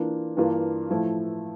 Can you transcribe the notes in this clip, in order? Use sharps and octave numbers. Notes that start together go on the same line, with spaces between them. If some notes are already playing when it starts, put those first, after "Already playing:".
Already playing: E3 A#3 D4 F4
G2 E3 A#3 D4 F4
A2 F3 A3 E4